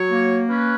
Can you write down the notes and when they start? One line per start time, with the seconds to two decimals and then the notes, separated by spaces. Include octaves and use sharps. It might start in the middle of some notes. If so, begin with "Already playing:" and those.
Already playing: F#3 C#5
0.11 A#3
0.50 C#4 B4